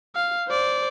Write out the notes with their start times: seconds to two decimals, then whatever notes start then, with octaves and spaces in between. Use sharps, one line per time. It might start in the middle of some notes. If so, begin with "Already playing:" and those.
0.16 F5
0.48 C5 D5